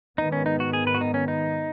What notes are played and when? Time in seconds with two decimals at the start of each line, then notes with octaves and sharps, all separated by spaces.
0.18 G#2 D#3 B3 D#4
0.32 C#4
0.46 D#4
0.60 F#4
0.73 G#4
0.87 B4
0.94 F#4
1.01 D#4
1.14 C#4
1.28 D#4